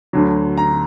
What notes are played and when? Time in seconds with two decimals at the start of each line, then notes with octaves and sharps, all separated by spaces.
0.13 D2 D3 F#3
0.57 A#5